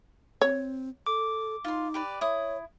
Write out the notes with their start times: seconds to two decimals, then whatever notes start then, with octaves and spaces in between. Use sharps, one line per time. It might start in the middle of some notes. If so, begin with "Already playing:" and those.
0.41 C4 C#5
1.06 A4 D6
1.64 D#4 F4 C6
1.94 G4 B4 D5
2.21 E4 C#5 D#6